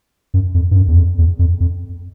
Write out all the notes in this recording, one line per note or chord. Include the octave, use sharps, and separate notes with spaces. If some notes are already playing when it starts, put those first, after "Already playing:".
F#2
F2
G2
F#2
E2
F2
E2
F2
F2